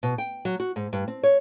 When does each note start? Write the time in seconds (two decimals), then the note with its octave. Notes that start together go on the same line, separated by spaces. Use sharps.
0.03 B2
0.18 G5
0.45 F#3
0.60 F#4
0.76 G#2
0.93 G2
1.08 C4
1.23 C#5